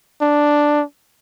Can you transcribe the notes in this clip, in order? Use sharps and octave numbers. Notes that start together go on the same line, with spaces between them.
D4